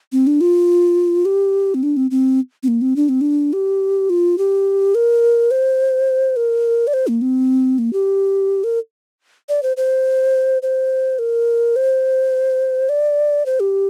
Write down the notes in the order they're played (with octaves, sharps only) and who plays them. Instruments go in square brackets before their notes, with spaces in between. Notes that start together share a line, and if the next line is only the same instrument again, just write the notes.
[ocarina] C4
D4
F4
G4
C4
D4
C4
C4
C4
A#3
C4
D4
C4
D4
G4
F4
G4
A#4
C5
A#4
D5
C5
A#3
C4
A#3
G4
A#4
D5
C5
C5
C5
A#4
C5
D5
C5
G4